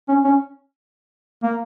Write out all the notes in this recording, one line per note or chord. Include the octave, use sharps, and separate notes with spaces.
C#4
C#4
A#3